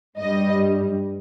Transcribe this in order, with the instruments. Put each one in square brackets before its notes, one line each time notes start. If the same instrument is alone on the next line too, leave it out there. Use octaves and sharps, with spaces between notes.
[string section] G2 G3 D#5